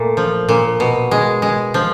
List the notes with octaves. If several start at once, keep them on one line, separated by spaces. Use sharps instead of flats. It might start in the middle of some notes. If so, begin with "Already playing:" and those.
Already playing: A#2 A3
F3
A#2
B2
G#3
G#3
F3